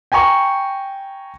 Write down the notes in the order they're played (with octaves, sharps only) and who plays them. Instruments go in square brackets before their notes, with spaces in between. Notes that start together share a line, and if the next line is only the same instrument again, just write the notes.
[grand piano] G5 G#5 A#5 C#6